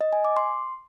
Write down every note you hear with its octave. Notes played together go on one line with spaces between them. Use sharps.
D#5
G#5
D6
C6